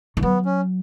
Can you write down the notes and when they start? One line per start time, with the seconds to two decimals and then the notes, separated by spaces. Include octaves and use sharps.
0.17 D#3
0.23 F#3 B3
0.45 C#4